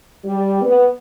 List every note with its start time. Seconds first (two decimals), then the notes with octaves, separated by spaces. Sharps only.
0.25 G3
0.62 B3